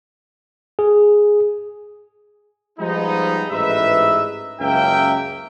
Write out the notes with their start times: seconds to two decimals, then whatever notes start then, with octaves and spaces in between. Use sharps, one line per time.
0.79 G#4
2.79 F3 G3 G#3 B3 D#4
3.50 A1 G#2 D#4 B4 E5
4.60 C#2 F#2 A#3 A#4 E5 G5